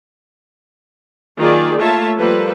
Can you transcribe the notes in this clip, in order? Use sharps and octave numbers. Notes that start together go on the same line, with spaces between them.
D#3 F#3 A#3 F4 G#4 D5
A3 A#3 F4 C#5 E5 A5
F3 G3 A#3 A4 B4